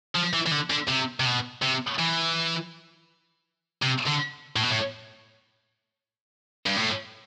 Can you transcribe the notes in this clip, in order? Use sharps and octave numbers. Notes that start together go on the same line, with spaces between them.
F3
E3
E3
D3
D3
C3
C3
B2
C3
E3
C3
D3
A2
B2
A2
G2
A2